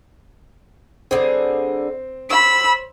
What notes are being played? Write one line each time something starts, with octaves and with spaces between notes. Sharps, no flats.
D3 G3 C4 G#4
C5 C#5 B5 E6